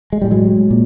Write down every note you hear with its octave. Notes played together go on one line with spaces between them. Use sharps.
G#3
A2 G3
F#3 G#3
A#2